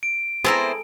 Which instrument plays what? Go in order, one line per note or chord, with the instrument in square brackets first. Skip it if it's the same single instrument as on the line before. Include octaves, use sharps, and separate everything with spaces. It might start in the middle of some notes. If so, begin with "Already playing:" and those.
[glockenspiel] D7
[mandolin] B3 C4 E4 [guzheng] G#4 A4 A#5 [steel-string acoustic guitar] C5